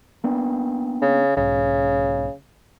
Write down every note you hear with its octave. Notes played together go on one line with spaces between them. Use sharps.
A#3 B3 D4
C#3
B1 G#2 C#3